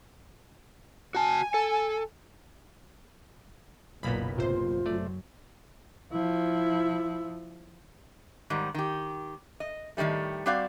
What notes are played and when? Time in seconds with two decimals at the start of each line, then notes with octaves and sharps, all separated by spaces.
1.15 F#4 G#5 A5
1.54 A4
4.03 F#1 B1 A#2 A#3 B3 B5
4.37 A1 C3 F4 C5
4.86 F#2 F#3 A3 D5
6.12 F3 E4
8.50 G#2 D#3 G3
8.74 D#3 G4
9.60 D#5
9.97 A2 D#3 F3 G3 A3
10.46 G3 C4 F#4 D5 F5